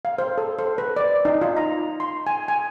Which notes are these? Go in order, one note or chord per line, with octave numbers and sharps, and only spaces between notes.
F5
C5
A4
C5
B4
D5
D#4
F4
A#5
C6
G#5
G#5